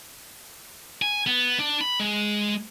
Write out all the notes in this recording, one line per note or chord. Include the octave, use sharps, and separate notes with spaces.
G#5
B3
D4
B5
G#3